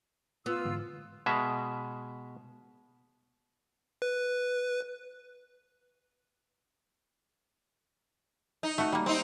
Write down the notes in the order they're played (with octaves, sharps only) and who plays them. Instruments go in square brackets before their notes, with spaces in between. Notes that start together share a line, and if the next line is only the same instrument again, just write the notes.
[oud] B3 [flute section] F4 E6
[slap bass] G#2 D3 E3
[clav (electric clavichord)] B2 G#3 E5
[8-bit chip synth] B4
[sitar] D#4
[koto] A3 F#4
G3 A#3
[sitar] C4 D#4